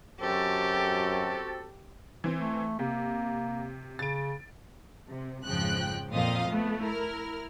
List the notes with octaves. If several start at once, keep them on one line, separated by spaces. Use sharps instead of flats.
F#2 C4 F#4 G4 A4
E3 C4
A3
C3 A#3
C#3 A6 D7
C3
F2 G#2 C#3 F3 G5 F#6
F2 A#2 C4 D#5 F5 D#6
A3 B3
E4 A#4 F6